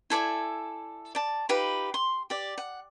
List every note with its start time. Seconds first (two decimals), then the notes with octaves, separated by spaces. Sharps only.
0.10 E4 A4 D5 G#5
1.15 D5 A5
1.49 D#4 F4 G4 B4
1.94 C6
2.30 G4 D5
2.58 F#5